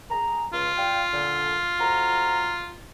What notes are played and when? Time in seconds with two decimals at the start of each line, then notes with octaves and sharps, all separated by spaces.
0.10 G#4 A#5
0.53 C#2 F4
0.77 D5 F5 G5
1.13 A#2 D3
1.80 F2 F#4 A#5